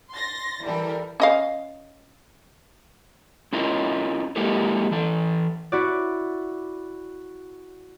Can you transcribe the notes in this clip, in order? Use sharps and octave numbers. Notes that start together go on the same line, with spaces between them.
C6 A6 A#6
E3 G3 A4 A#4
C#4 D#5 F5
C#4 E4 F4 A#4 D#5
G#3 A#3 E4 G4 A4 A#4
E3 A4
E4 F#4 D5